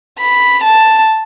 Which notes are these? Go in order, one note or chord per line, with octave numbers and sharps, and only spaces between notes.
B5
A5